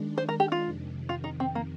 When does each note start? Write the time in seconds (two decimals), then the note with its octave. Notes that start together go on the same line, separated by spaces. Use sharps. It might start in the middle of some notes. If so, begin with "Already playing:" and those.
Already playing: D#3 G#3 D4
0.18 C5
0.29 A#4
0.40 G4
0.52 F4
0.63 F2 C3 D#3
1.09 F4
1.24 D#4
1.40 C4
1.55 A#3